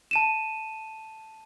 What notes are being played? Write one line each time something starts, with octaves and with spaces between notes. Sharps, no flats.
A5 D#7 E7